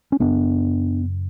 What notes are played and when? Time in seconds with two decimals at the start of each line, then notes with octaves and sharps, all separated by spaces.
0.12 C#4
0.20 F#2 C#3 B3 D4